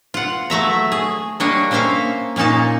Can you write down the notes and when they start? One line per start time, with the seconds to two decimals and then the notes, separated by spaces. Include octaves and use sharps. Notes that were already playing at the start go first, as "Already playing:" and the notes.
0.14 F4 F#5
0.50 F#3 A3 E5 A#5
0.92 G#4
1.40 G3 A#3 D4 C#5 D#5
1.71 A#3 C#4 C5 E5 F5
2.36 A#2 A#3 C#4 D#4 A5